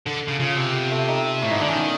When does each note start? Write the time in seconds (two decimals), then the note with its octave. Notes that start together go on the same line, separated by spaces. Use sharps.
0.06 D3 A4
0.28 C#3
0.40 C#3 F4
0.56 C3
0.74 B3
0.91 A3
1.08 D#4
1.42 A2 E4
1.51 G#2 D#4
1.60 D3 D4
1.68 D#3 C#4
1.77 B3